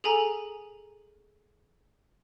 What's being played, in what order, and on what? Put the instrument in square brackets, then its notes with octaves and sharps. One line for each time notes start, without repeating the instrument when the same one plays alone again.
[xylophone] G#4 A4 G#5 A#5